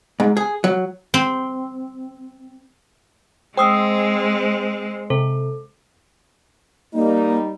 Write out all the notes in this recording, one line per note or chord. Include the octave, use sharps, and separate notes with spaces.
G#2
G#4
F#3
C4
G#3 C4 C5 G5 D#6 E6
C3 A4
G3 A#3 D#4